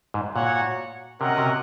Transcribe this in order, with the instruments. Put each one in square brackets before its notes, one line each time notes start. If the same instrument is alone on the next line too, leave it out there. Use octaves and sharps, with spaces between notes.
[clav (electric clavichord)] G#2
[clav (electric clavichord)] A#2 [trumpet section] F#4 C#5 F#5
[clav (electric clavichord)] C3 [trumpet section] C#4 F#4 A#4 D#5 F#5
[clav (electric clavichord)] C3